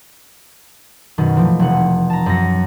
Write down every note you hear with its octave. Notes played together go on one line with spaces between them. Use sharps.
F#2 B2 D#3
E3 F3 A3
F1 F#5
A5 A#5
F#2 A#6